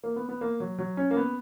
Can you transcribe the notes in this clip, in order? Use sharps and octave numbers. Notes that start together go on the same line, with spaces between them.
A#3
B3
B3
A#3
F#3
F#3
C#4
A#3
B3